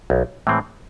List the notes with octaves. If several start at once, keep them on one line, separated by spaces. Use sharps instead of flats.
B1
A2 E3 G#3 C4